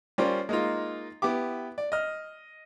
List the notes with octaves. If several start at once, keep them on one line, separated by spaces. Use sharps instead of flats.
G3 C#4 F4 A#4 C5 D5
G#3 A#3 D#4 F4
B3 E4 G4 D6
D5
D#5 F6